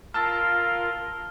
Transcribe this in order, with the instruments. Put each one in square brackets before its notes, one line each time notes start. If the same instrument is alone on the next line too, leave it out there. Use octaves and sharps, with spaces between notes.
[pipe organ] F4 A#4 F5 [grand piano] A5 E6 A6 [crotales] F6